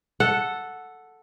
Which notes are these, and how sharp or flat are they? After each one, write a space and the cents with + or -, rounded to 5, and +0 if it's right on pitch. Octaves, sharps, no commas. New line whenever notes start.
A4 +0 F#5 -5